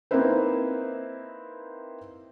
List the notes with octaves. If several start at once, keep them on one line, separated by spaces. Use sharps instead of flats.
A#3 C4 D#4 E4 B4 C5